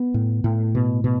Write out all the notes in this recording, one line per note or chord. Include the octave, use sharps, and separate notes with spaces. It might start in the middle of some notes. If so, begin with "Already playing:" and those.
Already playing: B3
A2
A2
B2
B2